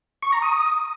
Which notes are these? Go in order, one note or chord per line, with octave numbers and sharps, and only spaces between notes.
C#6
A#5
D#6